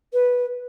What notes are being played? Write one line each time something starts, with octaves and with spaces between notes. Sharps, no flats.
B4